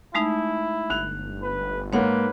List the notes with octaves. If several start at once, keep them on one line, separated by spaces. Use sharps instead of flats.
G#3 A3 D#4 E4
G1 F#6 F7
B4
G#2 A#3 B4 C#5 F#5